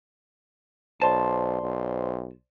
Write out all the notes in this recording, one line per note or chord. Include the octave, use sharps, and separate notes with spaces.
B1 C5 D5 A5 C6
B1